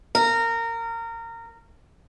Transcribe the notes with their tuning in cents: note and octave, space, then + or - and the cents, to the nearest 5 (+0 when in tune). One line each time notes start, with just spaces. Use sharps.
A#4 -20